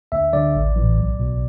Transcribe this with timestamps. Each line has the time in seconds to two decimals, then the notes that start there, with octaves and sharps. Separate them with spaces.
0.12 D2 E5
0.33 D3 D5
0.55 A1
0.76 E3
0.81 A2
0.98 B1
1.19 B2